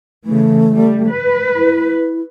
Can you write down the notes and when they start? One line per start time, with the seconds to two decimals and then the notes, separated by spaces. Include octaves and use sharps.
0.25 C#3 E3 A3
0.73 G3
1.10 B4
1.55 E4